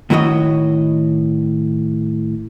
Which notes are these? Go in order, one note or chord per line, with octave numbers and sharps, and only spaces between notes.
A2 D#3 E4 F#4 C#5 D#5